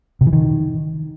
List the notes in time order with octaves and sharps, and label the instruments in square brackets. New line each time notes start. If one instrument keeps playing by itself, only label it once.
[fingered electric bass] C3
E3
D#3